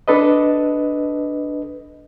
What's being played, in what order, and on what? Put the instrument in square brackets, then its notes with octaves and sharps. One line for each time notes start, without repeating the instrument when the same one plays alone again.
[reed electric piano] D4 A4 B4 D#5